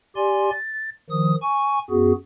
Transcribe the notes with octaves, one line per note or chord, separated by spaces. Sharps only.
G4 D5 G#5 C6
A6
D#3 F3 D#6
G#5 C#6
F#2 B3 F#4 G#4